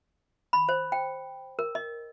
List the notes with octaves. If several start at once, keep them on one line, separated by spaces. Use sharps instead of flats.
B5
C5
G5
A#4
D#5